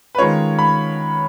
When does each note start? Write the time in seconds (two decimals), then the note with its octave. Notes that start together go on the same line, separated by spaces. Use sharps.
0.15 B4
0.18 D#3 G#3 C#4 F4 C#5
0.59 B5